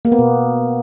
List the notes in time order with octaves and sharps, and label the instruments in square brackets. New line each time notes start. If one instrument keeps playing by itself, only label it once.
[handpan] A#3
B3
B2